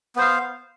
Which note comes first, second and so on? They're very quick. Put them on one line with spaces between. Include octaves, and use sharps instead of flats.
B3 C5 F5